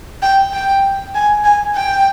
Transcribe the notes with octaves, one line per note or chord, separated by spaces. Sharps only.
G5
G5
G#5
G#5
G5